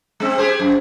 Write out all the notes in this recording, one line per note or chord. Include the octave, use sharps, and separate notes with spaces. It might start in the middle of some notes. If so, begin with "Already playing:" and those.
G#3 C4
G4 G#4 C5
F#2